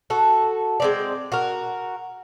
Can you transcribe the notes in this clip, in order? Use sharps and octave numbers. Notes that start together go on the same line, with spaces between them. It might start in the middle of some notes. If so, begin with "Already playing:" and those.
F#4 A4
G#3 C4 D5
F#4 A#4